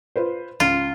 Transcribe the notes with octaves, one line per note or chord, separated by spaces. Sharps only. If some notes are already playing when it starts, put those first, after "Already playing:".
F4 B4 C5
C#2 F4